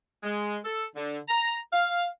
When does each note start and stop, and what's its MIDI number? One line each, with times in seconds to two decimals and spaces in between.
0.23 0.57 56
0.63 0.85 69
0.95 1.18 50
1.28 1.57 82
1.72 2.06 77